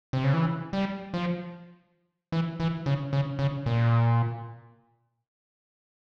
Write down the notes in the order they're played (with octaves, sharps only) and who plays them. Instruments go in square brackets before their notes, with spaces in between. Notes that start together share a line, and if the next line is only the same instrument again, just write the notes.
[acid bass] C3
C#3
E3
G3
F3
E3
E3
C#3
C#3
C#3
A#2